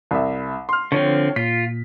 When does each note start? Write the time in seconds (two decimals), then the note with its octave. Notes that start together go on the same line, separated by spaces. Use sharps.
0.11 C2 E5
0.69 C6 F6
0.92 D3 F3 C4 C#5
1.36 A#2 F4 B6